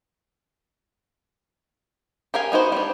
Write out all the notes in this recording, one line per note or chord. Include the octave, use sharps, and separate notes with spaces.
G4 A#4 F5 G#5
B3 D#4 F#4 C5
G3 D4